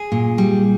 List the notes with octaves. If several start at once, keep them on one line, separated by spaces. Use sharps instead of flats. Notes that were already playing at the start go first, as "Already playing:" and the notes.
Already playing: G#4
A#2
G3